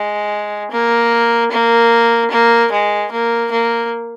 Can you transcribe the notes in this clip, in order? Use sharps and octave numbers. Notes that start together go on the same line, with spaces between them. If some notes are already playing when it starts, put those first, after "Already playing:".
Already playing: G#3
A#3
A#3
A#3
G#3
A#3
A#3